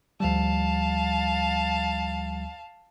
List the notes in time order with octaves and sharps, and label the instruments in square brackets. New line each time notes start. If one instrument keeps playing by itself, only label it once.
[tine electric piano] D2 F3 G3 [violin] F5 A5